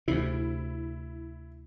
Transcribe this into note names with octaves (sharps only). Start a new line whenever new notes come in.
D2 C3 E4